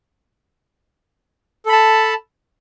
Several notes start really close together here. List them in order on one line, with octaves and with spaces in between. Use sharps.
A4 B5 A5